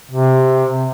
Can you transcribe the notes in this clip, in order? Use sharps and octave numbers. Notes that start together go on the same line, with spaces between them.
C3